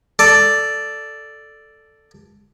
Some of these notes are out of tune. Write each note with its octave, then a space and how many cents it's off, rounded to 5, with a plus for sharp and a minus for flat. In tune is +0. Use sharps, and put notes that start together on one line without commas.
A4 +0 D5 +0